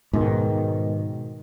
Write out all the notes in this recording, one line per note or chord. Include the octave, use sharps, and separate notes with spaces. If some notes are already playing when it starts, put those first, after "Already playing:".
G#2 B2 D#3